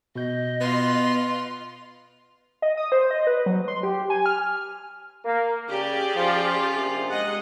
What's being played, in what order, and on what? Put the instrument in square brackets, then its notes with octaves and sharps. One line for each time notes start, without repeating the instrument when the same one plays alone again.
[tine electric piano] B2 G6 [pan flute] D#5
[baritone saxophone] B3 [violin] F4 C6
[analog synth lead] D#5
D#6
C5
D#5
B4
F#3
C6
G4
G#5
F6
[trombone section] A#3
[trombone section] C#3 [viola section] G4 G#4 D5
[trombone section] F3 [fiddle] C#4 F4
[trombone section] A#1 C3
[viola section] G#3 D#5 F#5